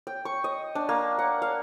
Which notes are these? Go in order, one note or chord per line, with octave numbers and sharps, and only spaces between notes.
G5
C#6
D#5
D4
A#3
F#5
F5